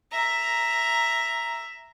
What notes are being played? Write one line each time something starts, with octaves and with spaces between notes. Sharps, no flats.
E5 A#5